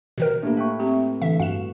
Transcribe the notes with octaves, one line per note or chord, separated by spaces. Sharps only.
B2 D#3 A#4
A2 A#3 D4 G4
B4 E5 G5 C#6
C4 G4
D3 E3 E5
G2 F#4 F5 E7